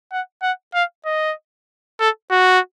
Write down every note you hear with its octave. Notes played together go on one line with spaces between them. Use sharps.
F#5
F#5
F5
D#5
A4
F#4